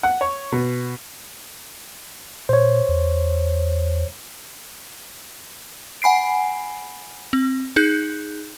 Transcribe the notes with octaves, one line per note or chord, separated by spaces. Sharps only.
F#5
C#5
B2
A#2 C5 C#5
E2
F#5 G#5 B5 C7 D7
C4
D#4 G#4 F#6 G6